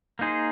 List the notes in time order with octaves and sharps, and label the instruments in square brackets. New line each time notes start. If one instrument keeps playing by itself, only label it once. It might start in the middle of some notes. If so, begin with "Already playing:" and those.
[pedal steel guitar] A#3 D#4 G#4 C5